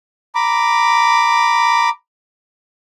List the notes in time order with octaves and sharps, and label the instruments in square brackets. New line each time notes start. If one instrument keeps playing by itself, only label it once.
[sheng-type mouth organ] A#5 B5 D6